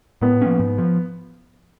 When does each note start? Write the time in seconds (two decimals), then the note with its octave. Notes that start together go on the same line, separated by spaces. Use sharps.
0.22 A2 B3
0.41 F3 A#3 C#4
0.59 G#2
0.78 F3